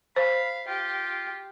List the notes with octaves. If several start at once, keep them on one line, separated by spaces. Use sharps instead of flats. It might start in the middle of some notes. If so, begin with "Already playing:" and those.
C5 F5 B5
F4 G4